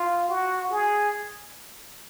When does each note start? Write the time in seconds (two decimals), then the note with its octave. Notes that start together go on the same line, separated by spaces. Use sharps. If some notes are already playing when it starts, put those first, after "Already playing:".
Already playing: F4
0.29 F#4
0.71 G#4